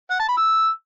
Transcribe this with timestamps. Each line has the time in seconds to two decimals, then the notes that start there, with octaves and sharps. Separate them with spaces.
0.11 F#5
0.19 A5
0.28 B5
0.37 E6